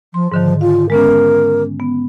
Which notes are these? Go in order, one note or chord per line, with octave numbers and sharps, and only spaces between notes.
F3 C6
G#2 D3 D#3 F3
F4 F5
G#3 B3 C#4 A#4
B3